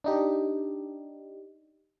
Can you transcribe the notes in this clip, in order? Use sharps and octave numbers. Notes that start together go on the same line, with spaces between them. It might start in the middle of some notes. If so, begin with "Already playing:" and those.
D4 D#4 G4